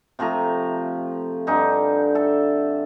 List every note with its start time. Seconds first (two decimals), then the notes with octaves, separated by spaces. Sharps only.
0.19 C3 F3 A3 A#5
1.47 G2 D3 D#4 G#5
2.15 A4 E5